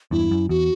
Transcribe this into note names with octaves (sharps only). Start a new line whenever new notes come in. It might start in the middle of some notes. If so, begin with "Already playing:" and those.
E2 G2 E4
F#2
E2 F#4